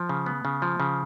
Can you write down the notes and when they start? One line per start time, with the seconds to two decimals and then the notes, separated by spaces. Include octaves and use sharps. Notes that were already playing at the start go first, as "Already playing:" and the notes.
Already playing: F3
0.09 C#3
0.26 B3
0.45 C#3
0.62 F3
0.80 C#3